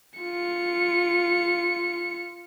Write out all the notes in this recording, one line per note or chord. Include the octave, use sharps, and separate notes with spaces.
F4 C#7